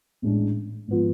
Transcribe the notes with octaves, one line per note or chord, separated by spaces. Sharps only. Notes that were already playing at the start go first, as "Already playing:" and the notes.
A1 A2 G#3 D4
G#1 F3 B3 F4